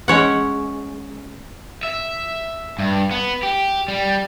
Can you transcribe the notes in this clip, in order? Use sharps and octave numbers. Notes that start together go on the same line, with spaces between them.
G#3 C#4 C#5 F#5
E5
G2
B3
G4
G3